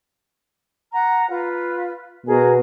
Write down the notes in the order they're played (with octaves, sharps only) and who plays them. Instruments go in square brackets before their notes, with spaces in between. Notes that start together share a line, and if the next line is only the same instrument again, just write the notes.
[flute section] F#5 A#5
F4 B4
[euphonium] B2 [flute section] F#4 G#4 A#4